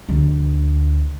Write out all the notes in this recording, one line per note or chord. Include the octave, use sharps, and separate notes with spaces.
D2